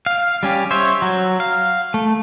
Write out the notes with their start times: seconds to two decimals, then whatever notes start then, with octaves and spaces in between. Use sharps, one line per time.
0.06 F5
0.43 G3 C#4 G4
0.71 C5 C#5 E5
1.02 F#3
1.40 F5
1.94 A3